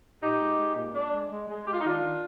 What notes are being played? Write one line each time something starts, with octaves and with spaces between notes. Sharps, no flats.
A#2 D#4 G4
G#3
G#3
A#2
G#3 D4
G#3
G#3
G#3
G#3 G4
F4
D#4
D#3 D4 F4
D#3